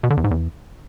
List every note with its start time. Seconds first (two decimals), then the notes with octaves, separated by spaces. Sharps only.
0.03 B2
0.10 D3
0.17 E2
0.24 G#2
0.31 E2